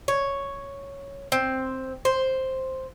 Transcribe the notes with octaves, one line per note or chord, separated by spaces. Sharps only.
C#5
C4
C5